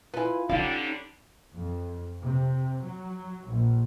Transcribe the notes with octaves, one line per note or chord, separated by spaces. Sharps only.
E4 F4 B4 G#5
D3 F#3 G3 C#4 D#4 F5
F2
C3
F#3
A#1